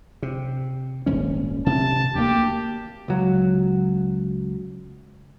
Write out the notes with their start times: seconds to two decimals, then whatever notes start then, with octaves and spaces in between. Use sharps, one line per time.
0.22 C3
1.06 D#1 G#1 C#4
1.66 C3 A5
2.15 D2 A#3 G4
3.08 C#2 F#3